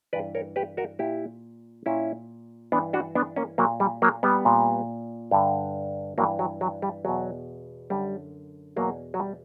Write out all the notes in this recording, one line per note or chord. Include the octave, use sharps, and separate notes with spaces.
G2 E3 B4 D5
A#4 C#5
G4 B4
F#4 A#4
A#2 E4 G4
A#2 C#4 E4
G2 E3 B3 D4
D4 F#4
B3 D4
A#3 C#4
A#2 F#3 A#3
G3
F#3 A#3
G3 B3
A#2
G2 D3
G2 E3 F#3 A#3
F#3
F#3
G3
E2 B2 F#3
F#2 D3 G3
E2 B2 F#3 A#3
F#3
G3